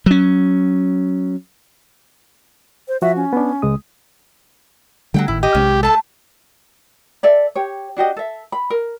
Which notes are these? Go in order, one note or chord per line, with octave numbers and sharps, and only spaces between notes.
F#3 C#4
C5
F3 F#4 E5
C#4
B3 D4
C#2 G#3 D#6
D3 F#3 G3 A3 F#5 G5
G#1 A2 D#3 E4
G4 D#5
B1 C3 G#3 C#4
A3 A4 A5
A4 D5 E5
G4 C#5
D4 F#4 G4 D#5
A4 E5
B5
A#4